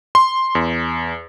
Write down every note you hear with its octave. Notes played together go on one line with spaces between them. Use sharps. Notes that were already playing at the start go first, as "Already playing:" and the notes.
C6
E2